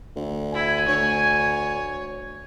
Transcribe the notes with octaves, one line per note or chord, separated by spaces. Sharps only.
D2
E4 G#5
D2 C#5